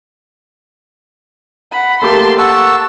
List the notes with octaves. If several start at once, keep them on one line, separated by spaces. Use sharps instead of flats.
F#5 B5
A3 A#3 G4 A5 C6
F#5 A5 C#6 E6